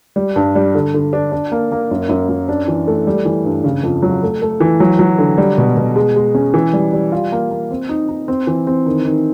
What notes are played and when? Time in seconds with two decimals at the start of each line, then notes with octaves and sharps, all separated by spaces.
0.16 G3
0.36 G2
0.55 G3
0.75 D3
0.94 D3
1.13 D4
1.32 D4
1.52 A#3
1.72 A#3
1.91 F#2
2.09 F#2
2.29 F#2
2.48 D4
2.68 E3
2.87 A3
3.07 G3
3.25 E3
3.45 G2
3.64 C#3
3.83 F2
4.02 F#3
4.23 A3
4.42 A3
4.60 E3
4.80 F#3
4.99 F#3
5.18 D3
5.38 G3
5.58 B2
5.77 B2
5.96 G#3
6.16 G#3
6.35 C#4
6.54 E3
6.73 G3
6.93 G3
7.12 F4
7.32 A#3
7.51 A#3
7.71 C4
7.89 D#4
8.08 D#4
8.28 C4
8.47 E3
8.67 C4
8.86 D#3
9.05 D#3